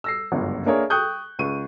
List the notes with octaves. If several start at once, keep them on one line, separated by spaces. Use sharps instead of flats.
E6 A#6 C7
G1 C#2 F#2
A#3 D4 G#4 A#4 C#5 E5
G5 C#6 D#6 F#6 G6
C#2 C#6 D#7